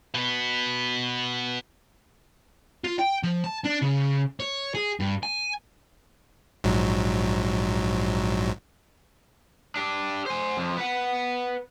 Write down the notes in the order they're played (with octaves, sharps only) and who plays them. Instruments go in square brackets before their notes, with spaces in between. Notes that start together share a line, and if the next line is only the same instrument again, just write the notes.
[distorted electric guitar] B2 B3
F4
G5
F3
A5
D4
C#3
C#5
G#4
G2
G#5
[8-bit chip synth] A#1 G#2 F#3
[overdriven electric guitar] D4 G4
C5 G#5
F2 F3
B4 F#5